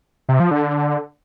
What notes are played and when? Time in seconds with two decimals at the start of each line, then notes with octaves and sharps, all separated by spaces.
0.29 C3
0.40 F3
0.51 D3